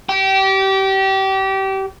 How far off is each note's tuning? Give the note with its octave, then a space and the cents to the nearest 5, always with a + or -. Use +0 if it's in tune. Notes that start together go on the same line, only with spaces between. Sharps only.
G4 -25